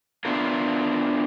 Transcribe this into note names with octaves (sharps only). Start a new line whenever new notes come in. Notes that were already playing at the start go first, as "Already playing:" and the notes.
B3 D4 E4 F4 A#4